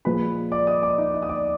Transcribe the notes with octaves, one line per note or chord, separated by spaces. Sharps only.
A#2 F3 G#3 B4 B5
D5 D6
D#5 D#6
D5 D6
D#4 D#5
D#4 D#5
D#6
D5 D6